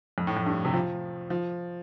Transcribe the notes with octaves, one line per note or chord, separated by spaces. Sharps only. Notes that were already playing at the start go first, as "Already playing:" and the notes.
F2
A2
F2
G2
C3
F3
F3